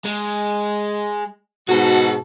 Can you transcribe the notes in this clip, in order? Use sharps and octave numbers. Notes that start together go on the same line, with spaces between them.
G#3
G#2 B2 F#4 G#4 A5